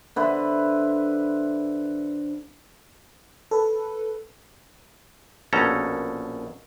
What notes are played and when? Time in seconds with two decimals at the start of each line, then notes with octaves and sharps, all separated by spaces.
0.16 D3 B4 C5 E5
3.51 A4 B4
5.53 A#1 B2 C#4 A4 A#5